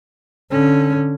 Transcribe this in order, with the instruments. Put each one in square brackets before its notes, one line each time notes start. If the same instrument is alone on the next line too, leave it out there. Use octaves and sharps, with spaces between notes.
[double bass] D3 C#4